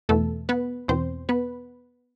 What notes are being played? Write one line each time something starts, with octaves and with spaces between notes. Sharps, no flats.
E2 B2 A3 A4
B3 B4
E2 B2 C4 C5
B3 B4